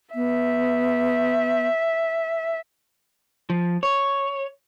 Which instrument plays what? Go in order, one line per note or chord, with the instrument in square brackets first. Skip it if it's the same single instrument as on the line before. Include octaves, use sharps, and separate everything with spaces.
[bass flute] B3 [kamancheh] E5
[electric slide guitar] F3
C#5